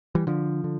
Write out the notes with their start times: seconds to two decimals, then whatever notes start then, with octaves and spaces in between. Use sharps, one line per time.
0.15 E3 G3
0.27 D3 F3
0.64 D3